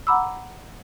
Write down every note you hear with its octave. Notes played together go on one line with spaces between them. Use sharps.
F#5 A#5 B5 D6 E6